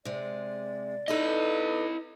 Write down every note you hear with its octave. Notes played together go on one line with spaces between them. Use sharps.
C3 G#3 D5
D#4 E4 A4 B4 D#5